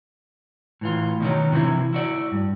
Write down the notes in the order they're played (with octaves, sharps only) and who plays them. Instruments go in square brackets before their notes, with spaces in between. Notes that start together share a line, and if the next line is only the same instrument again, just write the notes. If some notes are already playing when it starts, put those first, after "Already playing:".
[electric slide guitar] A2 E3 F4
B2 D#3 F#3
C3 E3 F3 E4
E4 F#4 D5
G2